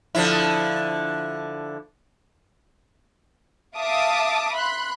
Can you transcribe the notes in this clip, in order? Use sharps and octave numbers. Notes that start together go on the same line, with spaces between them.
D3 F3 E4
E5 F5 A5 D6 D#6
B5 C6 F#6